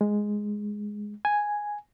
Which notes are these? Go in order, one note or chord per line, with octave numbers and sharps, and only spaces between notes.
G#3
G#5